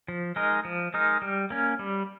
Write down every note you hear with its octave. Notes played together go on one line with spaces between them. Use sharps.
F3
G#3 D#4 A#4
F3
G#3 D#4 A#4
G3
A#3 C#4
G3